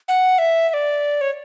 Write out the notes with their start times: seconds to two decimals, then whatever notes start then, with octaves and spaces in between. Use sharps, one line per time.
0.08 F#5
0.39 E5
0.69 E5
0.74 D5
1.21 C#5